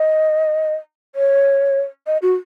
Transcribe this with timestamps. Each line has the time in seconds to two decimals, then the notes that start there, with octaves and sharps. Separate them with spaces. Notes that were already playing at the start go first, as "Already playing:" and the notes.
Already playing: D#5
1.15 C#5
2.07 D#5
2.22 F#4